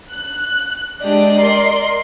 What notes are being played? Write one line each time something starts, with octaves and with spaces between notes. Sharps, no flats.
F#6
G#3 D4 G4 D5 D#5
A#4 C6